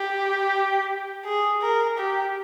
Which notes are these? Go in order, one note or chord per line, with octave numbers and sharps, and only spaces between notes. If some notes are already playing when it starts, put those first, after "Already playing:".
Already playing: G4
G#4
A#4
G4